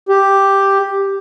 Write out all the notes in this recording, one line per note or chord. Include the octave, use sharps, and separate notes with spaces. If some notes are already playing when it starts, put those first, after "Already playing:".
G4